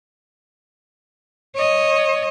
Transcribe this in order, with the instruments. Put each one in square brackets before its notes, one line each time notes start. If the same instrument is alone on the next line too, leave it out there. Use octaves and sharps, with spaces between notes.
[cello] C#5 D#5